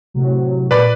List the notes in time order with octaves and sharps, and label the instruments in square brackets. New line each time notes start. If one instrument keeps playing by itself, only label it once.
[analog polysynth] A2 C3 F#3
[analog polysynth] A#2 [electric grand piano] B4 D5 B5